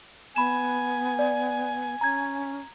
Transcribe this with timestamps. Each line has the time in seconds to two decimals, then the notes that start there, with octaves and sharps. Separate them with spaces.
0.36 B3 G#5 B5 E7
1.19 D5
2.01 C#4 A#5 G#6